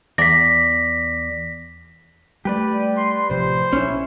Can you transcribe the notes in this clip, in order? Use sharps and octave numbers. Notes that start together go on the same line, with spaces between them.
E2 D5 A#6 B6
G3 A3 G4 B4 D5
C6
A1 C3 F3 C5
A#1 C#4 E4